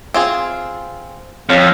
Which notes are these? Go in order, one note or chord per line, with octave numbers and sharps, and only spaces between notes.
C4 F4 G#4
F2 C#5 F5